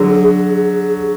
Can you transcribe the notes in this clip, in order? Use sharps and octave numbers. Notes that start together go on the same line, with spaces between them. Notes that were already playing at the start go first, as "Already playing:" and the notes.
Already playing: D3 F#3 G#4